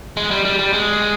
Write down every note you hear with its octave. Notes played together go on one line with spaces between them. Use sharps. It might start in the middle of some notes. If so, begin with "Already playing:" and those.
G#3
G3
G3
G3
G#3